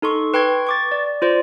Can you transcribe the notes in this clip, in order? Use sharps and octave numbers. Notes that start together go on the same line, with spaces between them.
D#4 A4 C6 C#6
B4 G5 C6 C#6 G#6
C#6 D6 A6
D5
F4 C5 D5